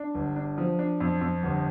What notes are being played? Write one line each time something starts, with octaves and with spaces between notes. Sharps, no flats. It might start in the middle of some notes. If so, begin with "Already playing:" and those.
Already playing: D4
G1
D4
F3
D4
F2
F2
G1